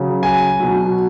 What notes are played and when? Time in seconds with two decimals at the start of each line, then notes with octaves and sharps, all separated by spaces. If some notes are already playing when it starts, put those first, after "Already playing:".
Already playing: C#3 F#3
0.23 G#5
0.60 B2 F#3